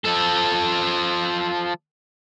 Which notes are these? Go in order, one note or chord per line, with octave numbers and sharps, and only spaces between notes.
F3 A4